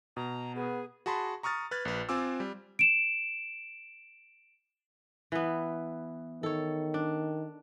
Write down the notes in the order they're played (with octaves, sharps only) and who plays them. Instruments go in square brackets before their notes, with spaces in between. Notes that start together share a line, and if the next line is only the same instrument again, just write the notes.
[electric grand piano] B2 [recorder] A#5
[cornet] B3 [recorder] G#4
[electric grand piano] F#4 G#4 A5 B5 C6
A#5 C#6 D#6 F6 A6
B4 F6 F#6 G#6 A6
A#1 B4
C4 F4 G#5 D6 E6
G3
[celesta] D7 E7
[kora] E3 B3
[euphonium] D#3 [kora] A4 C#5
[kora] D4